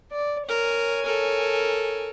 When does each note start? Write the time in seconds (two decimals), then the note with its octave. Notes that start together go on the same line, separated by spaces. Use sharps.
0.12 D5
0.49 A#4 C#5 G#5
1.06 A4 A#4